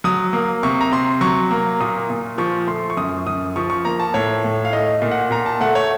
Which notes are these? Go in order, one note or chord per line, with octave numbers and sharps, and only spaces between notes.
F#3 D#6
A#3
C3 C#6
A#5
C3 C6
F#3 C#6
A#3
A#2 D#6
A#2
F3 C#6
A3 C6
C#6
F#2 D#6
F#2 D#6
F3 C#6
C#6
A#3 A#5
A5
A2 C#5
A2
F5
A3 D#5
A#2
F#5
A#2 A#5
A5
A3 F#5
C#5